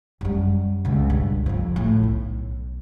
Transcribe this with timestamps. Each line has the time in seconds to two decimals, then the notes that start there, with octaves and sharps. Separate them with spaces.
0.21 F#2 G3
0.85 C#2 B2
1.10 G2
1.46 F2 F3
1.76 A2
2.03 B1